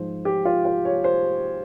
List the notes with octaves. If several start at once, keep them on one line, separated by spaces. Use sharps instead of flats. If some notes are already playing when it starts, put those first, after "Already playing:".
Already playing: G#2 F3 G#3 C5
G4
F4
F4
C#5
C5